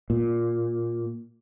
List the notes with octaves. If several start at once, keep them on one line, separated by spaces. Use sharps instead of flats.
A#2